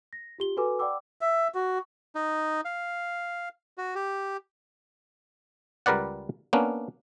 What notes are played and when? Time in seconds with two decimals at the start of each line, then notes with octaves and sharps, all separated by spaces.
0.13 A#6
0.38 F4 G4 G7
0.57 F#4 A4 B4 G#5 D6
0.79 D5 F#5 G5 B5 D6 E6
1.21 E5
1.55 F#4
2.15 D#4
2.65 F5
3.78 F#4
3.95 G4
5.86 C#2 G3 A#4 B4 D5 F#5
6.53 A#3 B3 C#4 D4